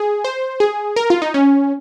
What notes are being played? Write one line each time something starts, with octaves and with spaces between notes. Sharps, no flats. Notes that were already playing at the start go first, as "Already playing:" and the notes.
Already playing: G#4
C5
G#4
A#4
F4
D#4
C#4